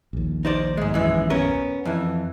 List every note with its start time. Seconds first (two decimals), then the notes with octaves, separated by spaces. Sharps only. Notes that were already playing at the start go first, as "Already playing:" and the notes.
0.13 A#1 D#2
0.45 D#4 C5 D5
0.77 G#2 G#3
0.94 F#2 E3 G#3
1.30 B3 C#4 A#4
1.85 F2 E3